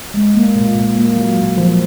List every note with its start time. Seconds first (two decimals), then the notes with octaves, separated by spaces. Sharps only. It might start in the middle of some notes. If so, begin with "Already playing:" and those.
0.14 G#3
0.34 A#3
0.55 A#2
0.76 A#2
0.96 A#3
1.16 F#3
1.37 A#2
1.57 F3